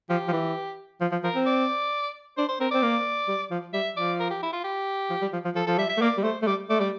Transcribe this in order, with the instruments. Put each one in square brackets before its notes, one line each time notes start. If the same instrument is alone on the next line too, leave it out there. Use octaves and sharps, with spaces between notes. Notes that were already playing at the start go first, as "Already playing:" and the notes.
[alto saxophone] F3 [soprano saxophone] G4
[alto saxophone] F3
E3
F3
F3
[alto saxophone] F3 [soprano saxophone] A#4
[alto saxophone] C4
[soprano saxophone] D5
[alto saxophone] D4 [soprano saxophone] C5
[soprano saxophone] C5
[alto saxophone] C4 [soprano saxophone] A#4
[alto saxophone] C4 [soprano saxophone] D5
[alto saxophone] A#3
G3
F3
[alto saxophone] G3 [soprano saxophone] E5
[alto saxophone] F3 [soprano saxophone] D5
[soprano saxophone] A#4
G4
E4
F4
G4
[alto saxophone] F3
G3
F3
F3
[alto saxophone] F3 [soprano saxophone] A4
[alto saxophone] F3 [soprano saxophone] A4
[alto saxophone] G3 [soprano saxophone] E5
[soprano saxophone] E5
[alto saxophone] A3
[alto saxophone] A#3 [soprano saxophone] D5
[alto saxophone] G3
[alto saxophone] A3 [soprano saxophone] C5
[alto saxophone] A3
[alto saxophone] G3 [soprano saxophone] D5
[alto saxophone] A3 [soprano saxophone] D5
[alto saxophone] G3 [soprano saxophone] D5